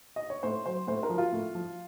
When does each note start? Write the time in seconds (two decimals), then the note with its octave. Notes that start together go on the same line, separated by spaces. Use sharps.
0.16 D#5
0.30 C#5
0.43 A2 C5
0.66 F#3 C5
0.87 A2 C5
1.03 A#4
1.10 F3
1.18 F4
1.32 A2
1.55 F3